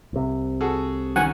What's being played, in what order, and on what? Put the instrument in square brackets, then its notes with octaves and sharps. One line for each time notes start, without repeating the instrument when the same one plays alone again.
[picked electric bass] C2 C3
[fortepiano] F#4 G#4 A4
[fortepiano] D#3 C#4 [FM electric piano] F#5 G#5